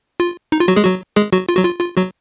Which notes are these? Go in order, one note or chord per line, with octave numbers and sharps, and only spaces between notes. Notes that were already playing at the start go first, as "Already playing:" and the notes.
F4
D#4
F4
F#3 F#4
G#3 G#4
F#3 F#4
G#3 G#4
F#3 F#4
F4
F#3 F#4
F4
F4
F#3 F#4